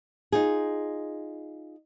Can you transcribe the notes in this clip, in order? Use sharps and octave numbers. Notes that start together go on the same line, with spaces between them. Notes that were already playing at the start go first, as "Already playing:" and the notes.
D#4 F4 G#4